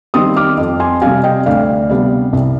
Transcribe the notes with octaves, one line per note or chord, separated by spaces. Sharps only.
D#3 G3 C4 C6 D#6
D6 F6
F2
G#5 C6
C3 G3 F5 G#5
D#5 G5
D2 D5 F5
C3 G3 B3 D4
C2